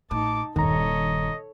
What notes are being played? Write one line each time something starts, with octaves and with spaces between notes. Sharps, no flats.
A1 A2 D#4 A5 D6
D#1 G2 D#3 A4 C#5 D#5 A#5